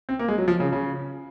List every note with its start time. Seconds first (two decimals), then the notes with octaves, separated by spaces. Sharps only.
0.09 C4
0.19 A#3
0.28 G#3
0.38 F#3
0.48 F3
0.60 C#3
0.73 C#3